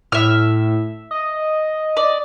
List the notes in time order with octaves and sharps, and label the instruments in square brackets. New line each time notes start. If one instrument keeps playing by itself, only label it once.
[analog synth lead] A2 [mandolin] E5 F6
[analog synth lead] D#5
[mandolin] D5